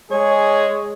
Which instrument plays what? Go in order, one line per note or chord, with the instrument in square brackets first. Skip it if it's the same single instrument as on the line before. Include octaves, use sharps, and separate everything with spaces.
[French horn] G#3 [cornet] G#4 [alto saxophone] C#5